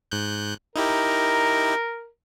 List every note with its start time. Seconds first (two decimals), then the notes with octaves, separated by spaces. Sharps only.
0.11 G#2 F#6 G6
0.76 D#4 E4 G4 A#4